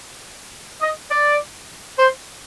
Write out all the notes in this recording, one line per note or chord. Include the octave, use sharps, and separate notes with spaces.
D#5
D5
C5